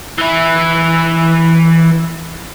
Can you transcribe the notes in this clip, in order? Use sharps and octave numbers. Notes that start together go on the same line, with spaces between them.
E3 E4